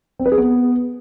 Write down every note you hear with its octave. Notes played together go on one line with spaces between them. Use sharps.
C4
B4
G#4
B3